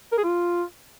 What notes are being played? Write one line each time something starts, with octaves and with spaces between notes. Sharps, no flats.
A#4
G#4
F4